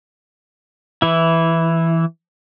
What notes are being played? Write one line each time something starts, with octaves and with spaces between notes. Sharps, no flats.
E3 E4